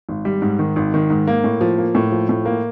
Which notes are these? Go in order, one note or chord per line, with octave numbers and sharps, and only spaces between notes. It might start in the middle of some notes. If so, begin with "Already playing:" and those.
G#1
G3
G#2
D#3
G#1
D#3
G#2
A#3
A2
F3
A#3
A2
F3
A2
A#3